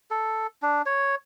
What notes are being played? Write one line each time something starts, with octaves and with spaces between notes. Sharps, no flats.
A4
D4
C#5